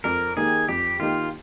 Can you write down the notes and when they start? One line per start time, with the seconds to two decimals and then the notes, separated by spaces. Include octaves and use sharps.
0.04 F2 A#4
0.37 D#3 A#3 D#4 G4 G#4
0.69 F2 G4
1.00 D#3 A#3 D#4 F4 G4